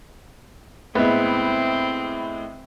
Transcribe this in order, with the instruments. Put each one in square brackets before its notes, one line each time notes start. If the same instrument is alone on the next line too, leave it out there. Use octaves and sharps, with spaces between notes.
[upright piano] A2 G#3 E4 [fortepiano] B3 [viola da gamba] C4